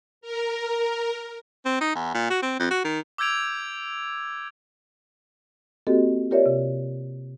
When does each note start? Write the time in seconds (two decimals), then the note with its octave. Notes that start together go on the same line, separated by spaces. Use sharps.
0.21 A#4
1.65 C4
1.81 D#4
1.95 E2
2.14 A#2
2.30 F#4
2.42 C4
2.59 F2
2.71 F#4
2.84 D#3
3.18 D6 E6 G6 G#6 D7 F7
5.87 A#3 C4 F#4 G4 A4 D#5
6.31 F4 G4 A#4 C#5 D5 E5
6.46 C3